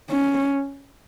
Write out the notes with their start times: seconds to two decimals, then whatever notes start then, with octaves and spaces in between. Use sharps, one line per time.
0.11 C#4